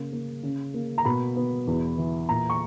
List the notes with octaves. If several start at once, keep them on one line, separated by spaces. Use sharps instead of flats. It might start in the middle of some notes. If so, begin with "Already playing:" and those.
Already playing: C#3 A#3
A#3
C#3
A#3
A#5
B2 B5
B3
E2
E3
A#2 A#5
C#6